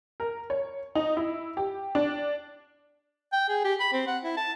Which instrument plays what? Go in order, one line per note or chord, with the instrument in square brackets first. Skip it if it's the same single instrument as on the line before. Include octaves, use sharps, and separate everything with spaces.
[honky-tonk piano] A#4
C#5
D#4
E4
G4
D4
[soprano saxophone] G5
G#4
G4
B5
C4
F#5
E4
A5